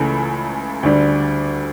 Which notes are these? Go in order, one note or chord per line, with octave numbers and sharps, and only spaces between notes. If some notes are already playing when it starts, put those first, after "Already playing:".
Already playing: C#2 C#3 E3 A3
D2 D3 G3 D4